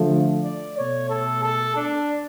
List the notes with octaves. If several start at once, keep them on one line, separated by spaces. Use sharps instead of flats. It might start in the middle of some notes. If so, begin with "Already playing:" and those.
Already playing: D3 F3 A3
D5
B2 A3 C#5
A4
A4
D4